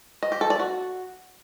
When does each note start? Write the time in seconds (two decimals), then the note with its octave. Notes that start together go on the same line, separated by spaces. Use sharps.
0.23 D#5
0.32 G4
0.41 A4
0.50 D5
0.60 F#4